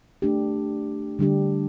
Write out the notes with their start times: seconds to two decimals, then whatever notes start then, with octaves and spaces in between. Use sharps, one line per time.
0.22 A3 D4 G4
1.19 D3 G3 D4 G4